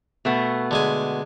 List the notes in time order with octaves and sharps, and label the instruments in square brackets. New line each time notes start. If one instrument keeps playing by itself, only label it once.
[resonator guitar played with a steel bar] B2 A3 B3
[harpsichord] D3 G#3 G#5